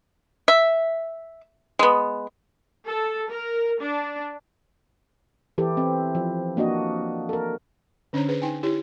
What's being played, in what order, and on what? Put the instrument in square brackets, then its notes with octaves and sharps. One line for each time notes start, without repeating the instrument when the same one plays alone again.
[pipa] E5
G#3 B3
[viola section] A4
A#4
D4
[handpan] E3 E4 G4 A4
C4
F3
A#3 D4 F#4 D#5
A4 A#4
[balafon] D3 C#4 D4 C5 C#5 A#5
G#4 B4 C5
D#4 G5 G#5
E4 G4 C#5